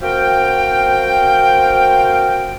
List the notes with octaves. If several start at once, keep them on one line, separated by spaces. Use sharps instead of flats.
C4 F#4 A#4 C5 F5 G5